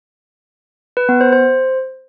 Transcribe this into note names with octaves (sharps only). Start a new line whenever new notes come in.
B4
B3
C5
C5